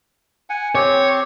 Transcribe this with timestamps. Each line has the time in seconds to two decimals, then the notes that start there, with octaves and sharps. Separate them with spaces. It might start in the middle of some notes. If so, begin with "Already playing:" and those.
0.50 F#5 G#5
0.75 C4 G4 C#5